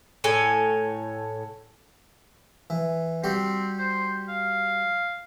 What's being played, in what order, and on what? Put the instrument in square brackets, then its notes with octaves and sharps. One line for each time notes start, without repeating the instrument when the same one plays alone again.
[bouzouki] A2 A4 C#5 G#5
[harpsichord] E3
[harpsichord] G3 F#4 G4 [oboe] C4
[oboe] C5
F5